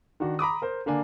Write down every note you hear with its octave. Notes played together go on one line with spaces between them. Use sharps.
D#3 D4 F#4
A#5 B5 D6 D#6
A#4 C5
D3 A#3 D4 G#5